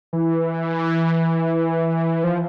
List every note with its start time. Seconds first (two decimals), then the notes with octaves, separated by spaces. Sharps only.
0.13 E3
2.24 F3